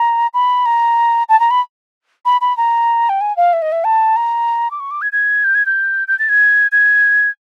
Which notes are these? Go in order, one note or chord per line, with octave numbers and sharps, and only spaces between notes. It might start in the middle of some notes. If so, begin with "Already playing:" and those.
Already playing: A#5
B5
A#5
A5
A#5
B5
B5
B5
A#5
G5
G#5
F5
E5
D#5
E5
A5
A#5
D6
C#6
D6
G#6
G#6
G6
G#6
G6
G6
A6
G#6
G#6